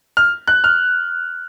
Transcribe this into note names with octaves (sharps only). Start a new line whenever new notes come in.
F6
F#6
F6